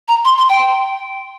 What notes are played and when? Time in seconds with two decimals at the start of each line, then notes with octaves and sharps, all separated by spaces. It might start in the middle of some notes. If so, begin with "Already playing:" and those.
0.08 A#5
0.25 C6
0.38 C6
0.49 G5